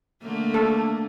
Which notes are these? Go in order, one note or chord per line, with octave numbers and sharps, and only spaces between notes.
D3 A3 A#3
A4